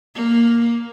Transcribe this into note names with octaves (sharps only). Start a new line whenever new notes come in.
A#3